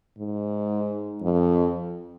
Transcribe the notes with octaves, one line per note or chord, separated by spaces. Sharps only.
G#2
F2